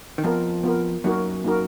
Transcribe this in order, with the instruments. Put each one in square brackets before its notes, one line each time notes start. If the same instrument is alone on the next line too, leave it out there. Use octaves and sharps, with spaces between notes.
[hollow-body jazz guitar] D#3
[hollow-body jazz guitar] F2 F3 [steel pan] B3 F4 A#4
[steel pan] B3 F4 A#4
[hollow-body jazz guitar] F#2 F#3 [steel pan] A#3 D#4 F#4 A#4
[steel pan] A#3 D#4 F#4 A#4